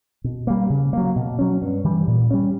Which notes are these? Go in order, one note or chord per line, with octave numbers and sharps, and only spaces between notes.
B2
G3 A#3
C#3
F#3 A#3
B2
F#3 C#4
G2
E3 G3
A#2
G3 C#4